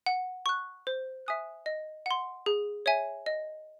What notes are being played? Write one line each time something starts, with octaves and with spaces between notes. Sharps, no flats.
F#5
C#6 F#6
C5
E5 G#5 D#6 F#6
D#5
F#5 C6
G#4
C#5 E5 G#5
D#5